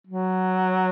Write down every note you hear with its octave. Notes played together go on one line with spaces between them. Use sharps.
F#3